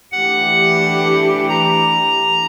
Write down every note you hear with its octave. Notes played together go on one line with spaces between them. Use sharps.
E3 A3 D4 G4 F#5
A#5